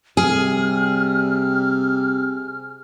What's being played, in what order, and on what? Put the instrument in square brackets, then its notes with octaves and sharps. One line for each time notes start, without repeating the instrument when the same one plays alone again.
[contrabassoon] C3 [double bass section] G3 [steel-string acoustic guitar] G#4 [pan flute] F6